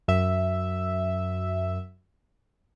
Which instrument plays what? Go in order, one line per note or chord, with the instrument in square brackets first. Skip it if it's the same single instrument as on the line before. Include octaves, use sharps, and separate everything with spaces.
[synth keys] F#2 E5